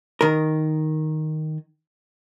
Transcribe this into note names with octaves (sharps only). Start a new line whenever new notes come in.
D#3 A#4